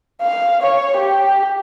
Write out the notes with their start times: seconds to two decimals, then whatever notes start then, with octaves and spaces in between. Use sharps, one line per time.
0.21 F5
0.62 C#5
0.97 G4